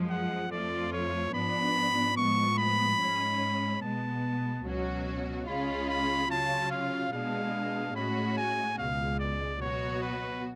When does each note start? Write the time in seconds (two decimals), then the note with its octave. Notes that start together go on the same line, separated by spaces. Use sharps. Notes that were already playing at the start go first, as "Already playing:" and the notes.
Already playing: F#2 F3 G#3
0.10 F#5
0.51 F2 F3 A3 F4 D5
0.93 C#5
1.34 G#2 F3 B3 D4 B5
2.17 A2 F3 G#3 B3 C#6
2.58 B5
3.00 G#2 G#3 C#4
3.82 B2 G#3 B3 A5
4.65 C#2 B2 F#3 C#4 F#4
5.47 C#2 C#3 G#3 C#4 F4 B5
5.89 B5
6.31 C#3 F#3 C#4 F4 A5
6.71 F5
7.13 B2 G#3 B3 D4 F5
7.95 A2 G#3 C#4 F#4 B5
8.37 G#5
8.78 C#2 B2 G#3 F5
9.20 D5
9.61 B2 F#3 B3 F#4 C#5
10.02 B4